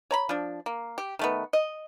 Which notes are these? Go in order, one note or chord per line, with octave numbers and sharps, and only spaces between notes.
C#5 A#5 B5
F3 D4
A#3
G4
D#3 A3 B3
D#5